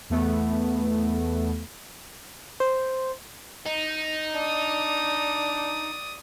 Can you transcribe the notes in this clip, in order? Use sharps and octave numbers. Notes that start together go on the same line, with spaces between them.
E2 A3 B3
C5
D#4
D4 D5 D#6